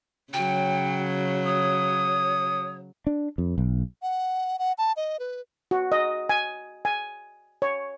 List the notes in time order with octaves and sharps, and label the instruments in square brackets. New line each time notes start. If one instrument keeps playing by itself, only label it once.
[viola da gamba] C#3 F#3 [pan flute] G5
[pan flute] C#5 [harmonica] D#6
[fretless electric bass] D4
F2
B1
[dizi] F#5
F#5
A5
D#5
B4
[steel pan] F#4
D#5
G#5
G#5
C#5